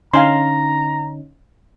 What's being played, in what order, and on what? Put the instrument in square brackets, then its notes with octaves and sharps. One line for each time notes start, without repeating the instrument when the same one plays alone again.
[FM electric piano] D3 C#4 D#4 [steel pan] F5 G#5 C6 [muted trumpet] A#5